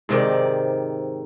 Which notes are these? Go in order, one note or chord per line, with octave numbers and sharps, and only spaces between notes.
G#2 C3 D#3 D5